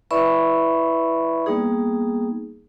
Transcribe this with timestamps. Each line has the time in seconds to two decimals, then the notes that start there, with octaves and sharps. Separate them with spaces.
0.11 E4 B4 D5 E5 B5 C#6
1.46 G3 A#3 B3 D#4 G#4